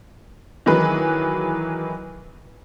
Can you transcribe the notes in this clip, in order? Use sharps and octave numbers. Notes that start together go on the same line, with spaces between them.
D#3 E3 F#3 G#4 B4